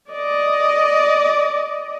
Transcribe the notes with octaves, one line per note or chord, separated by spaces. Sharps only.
D5 D#5